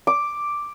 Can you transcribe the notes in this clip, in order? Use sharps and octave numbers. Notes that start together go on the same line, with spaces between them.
D6